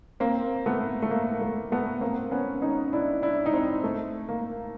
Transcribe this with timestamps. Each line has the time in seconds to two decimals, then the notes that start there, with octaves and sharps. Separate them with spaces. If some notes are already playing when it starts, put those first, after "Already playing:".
0.20 A#3 C4
0.66 A3 B3
1.02 A3
1.11 A#3
1.41 A3
1.72 A3 B3
2.01 A#3 C4
2.31 B3 C#4
2.62 C#4 D#4
2.93 D4 E4
3.22 D4 E4
3.46 D#4
3.53 C4 D4
3.84 A3
4.29 A#3